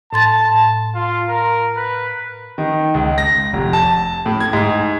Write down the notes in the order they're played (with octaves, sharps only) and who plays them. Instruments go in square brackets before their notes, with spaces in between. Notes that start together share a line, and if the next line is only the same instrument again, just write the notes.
[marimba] A2 C6 A6 [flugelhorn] A5
[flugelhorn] F4
A#4
B4
[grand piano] D#3
C#2
A#6
F1
A5
A2
G#6
G#2